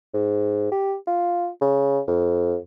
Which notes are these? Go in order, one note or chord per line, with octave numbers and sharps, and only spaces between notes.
G#2
G4
F4
C#3
F2